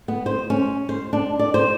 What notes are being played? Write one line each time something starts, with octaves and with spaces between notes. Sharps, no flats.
B3
C5
C#4
C5
D4
D5
C5